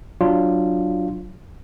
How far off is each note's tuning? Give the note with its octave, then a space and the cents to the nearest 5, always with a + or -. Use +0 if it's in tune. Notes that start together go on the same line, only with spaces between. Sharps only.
F#3 +0 D4 +10 F4 -5